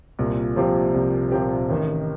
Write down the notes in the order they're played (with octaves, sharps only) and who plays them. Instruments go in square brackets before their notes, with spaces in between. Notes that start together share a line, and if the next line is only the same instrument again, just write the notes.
[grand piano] C2 [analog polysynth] A#2
[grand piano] C3 F3 C4 G4
C2
C3 F3 C4 G4
[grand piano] A1 [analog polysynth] D#3